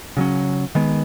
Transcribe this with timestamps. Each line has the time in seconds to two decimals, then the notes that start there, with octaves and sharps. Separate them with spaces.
0.17 C#3 F#3 C#4
0.75 D#3 G#3 B3